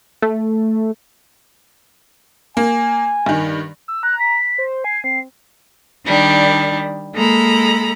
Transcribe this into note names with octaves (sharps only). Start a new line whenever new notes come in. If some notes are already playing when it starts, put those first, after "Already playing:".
A3
A#3 G#5
G2 D#3
E6
A#5 F#6
B6
C5
G#5 C7
C4 C7
D#3 G3 D4
G#3 A#3 A4 A#5 B5